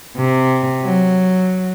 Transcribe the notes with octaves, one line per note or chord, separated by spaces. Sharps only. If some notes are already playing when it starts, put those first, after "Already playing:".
C3
F#3